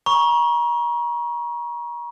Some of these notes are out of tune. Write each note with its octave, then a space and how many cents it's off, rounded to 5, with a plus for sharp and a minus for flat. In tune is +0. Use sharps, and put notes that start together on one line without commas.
A#5 +35 C#6 +0